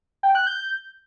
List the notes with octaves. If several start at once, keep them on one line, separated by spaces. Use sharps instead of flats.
G5
F#6
G6